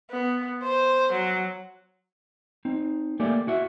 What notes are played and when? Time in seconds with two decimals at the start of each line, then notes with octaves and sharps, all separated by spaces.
0.11 B3
0.63 C5
1.12 F#3
2.65 C4 D#4
3.20 A3 A#3 G4 A4 D5 G#5
3.47 E4 F#4 E5